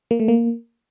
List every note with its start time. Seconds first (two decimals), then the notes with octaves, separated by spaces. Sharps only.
0.11 A#3
0.20 A3
0.28 A#3